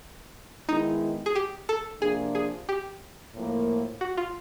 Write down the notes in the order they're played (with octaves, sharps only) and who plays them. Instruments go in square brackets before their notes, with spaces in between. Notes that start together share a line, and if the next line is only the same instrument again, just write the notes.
[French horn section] D#3 G#3 B3 E4 [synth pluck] D#4
[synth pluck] G#4
G4
A4
[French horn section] C3 F3 A#3 D4 [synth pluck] G#4
[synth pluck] G#4
G4
[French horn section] A2 F3 A#3
[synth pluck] F#4
F4